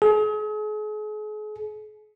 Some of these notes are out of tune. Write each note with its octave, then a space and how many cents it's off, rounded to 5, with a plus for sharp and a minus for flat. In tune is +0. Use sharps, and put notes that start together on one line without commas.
G#4 +40